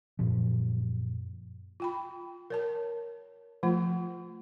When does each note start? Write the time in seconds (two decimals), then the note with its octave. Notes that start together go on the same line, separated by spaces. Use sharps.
0.19 F#2 A#2 F3
1.80 F4 G5 B5
2.50 A#4 C#5 A5
3.63 F3 A3 F4